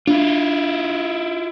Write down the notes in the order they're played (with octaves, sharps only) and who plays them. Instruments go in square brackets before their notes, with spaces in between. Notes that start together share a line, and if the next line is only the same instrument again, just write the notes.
[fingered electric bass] D4 [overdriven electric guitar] E4 F4